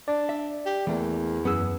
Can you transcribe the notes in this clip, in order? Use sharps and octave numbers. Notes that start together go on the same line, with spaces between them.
D4 D5
E5
G4
E2 E3 A3 A#3
F#2 B3 G#4 E6